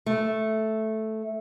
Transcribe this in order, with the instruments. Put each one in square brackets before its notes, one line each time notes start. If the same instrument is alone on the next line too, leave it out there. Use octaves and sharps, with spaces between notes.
[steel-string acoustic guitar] A3